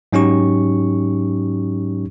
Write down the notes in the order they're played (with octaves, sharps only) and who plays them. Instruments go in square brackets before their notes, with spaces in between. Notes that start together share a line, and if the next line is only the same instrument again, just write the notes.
[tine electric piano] G#2 F#3 C#4 D#4 G4 C#6